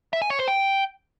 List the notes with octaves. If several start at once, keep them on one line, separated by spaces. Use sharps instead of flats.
E5
G#5
C#5
C5
G5